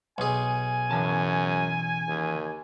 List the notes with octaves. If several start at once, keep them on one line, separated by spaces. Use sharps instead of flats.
B1 G#4 G#5
F#2 C#3 E3 A5
D#2